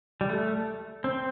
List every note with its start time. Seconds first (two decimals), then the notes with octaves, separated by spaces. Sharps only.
0.21 G3
0.29 A3
1.04 C4